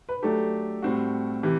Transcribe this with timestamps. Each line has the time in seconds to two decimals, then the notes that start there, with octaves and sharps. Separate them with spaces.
0.09 B4
0.22 F#3 A3 D4 G4 A4
0.82 A2 G3 C4 F#4
1.43 C3 E3 G4